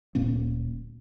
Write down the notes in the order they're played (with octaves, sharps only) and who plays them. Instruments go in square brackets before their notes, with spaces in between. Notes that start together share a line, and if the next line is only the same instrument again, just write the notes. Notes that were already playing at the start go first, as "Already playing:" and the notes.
[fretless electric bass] D1 A#2 A#3 C#4